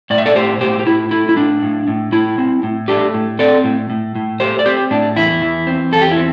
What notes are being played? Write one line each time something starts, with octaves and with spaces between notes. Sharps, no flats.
A2 D5
E5
A4 D5
A2 G4 C5
A2 G4 C5
G4
A2 E4
A3 E4
E4
A2 D4
A2
A2
A2 E4
C4
A2
A3 D4 G4
A2
C4 A4 D5
A2
A2
A2
A3 G4 C5
D5
C4 G4 C5
A2 D4
E2 E4
E3
C4
E2 A4
G4
E4
C4